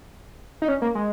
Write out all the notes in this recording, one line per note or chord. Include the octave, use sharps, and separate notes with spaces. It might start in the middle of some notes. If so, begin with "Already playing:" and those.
D#4
C#4
A#3
G#3